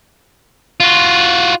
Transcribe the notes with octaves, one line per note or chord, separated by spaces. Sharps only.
F4 F#4